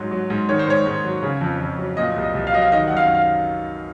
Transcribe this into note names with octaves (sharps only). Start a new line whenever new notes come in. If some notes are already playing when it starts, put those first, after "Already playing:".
Already playing: G#2 F#3
F#3
G#2
D#3 C#5
C5
G#2 C#5
G#2
F#3
C#3
F2
F2
F#3
A#2 D#5
C2
D#5
C2
F5
F#3 D#5
F5
D#3 D#5
F#2 F#5
F5
F5